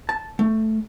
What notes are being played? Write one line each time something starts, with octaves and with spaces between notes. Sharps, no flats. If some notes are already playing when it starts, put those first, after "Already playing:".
A5
A3